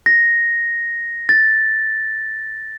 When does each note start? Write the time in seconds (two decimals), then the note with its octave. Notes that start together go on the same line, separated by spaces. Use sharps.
0.06 A#6
1.29 A6